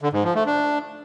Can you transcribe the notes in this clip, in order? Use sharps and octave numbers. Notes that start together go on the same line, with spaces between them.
D3
G#2
F3
A3
D4